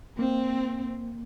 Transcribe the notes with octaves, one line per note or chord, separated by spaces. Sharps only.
A#3 C4